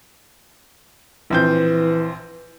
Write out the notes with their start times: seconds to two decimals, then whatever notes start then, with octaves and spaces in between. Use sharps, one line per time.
1.31 A#1 E3 C4 G6